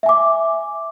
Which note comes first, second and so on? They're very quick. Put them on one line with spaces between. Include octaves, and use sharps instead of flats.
E5 G#5 D6